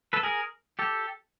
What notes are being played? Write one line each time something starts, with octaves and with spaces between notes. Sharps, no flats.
A4 B4
G#4 A#4
G4 A4